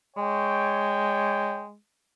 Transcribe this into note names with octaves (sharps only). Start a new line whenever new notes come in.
G#3 C#5 G5